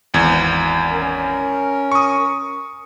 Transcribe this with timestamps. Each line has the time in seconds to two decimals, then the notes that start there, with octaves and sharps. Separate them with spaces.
0.14 G#1 E2 G#6
0.92 C#4 A#4
1.92 C#6 D#6